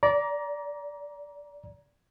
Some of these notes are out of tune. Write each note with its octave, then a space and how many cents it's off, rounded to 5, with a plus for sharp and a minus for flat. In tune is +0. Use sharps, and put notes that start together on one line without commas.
D5 -20 A#5 +20